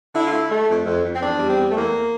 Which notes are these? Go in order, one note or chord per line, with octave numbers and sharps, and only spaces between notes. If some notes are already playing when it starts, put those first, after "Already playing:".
D3 E4
F4
A3 E4
A3
F2
F2
F2
C4
E2 D4
G3
C4
E2
A3
E2 A#3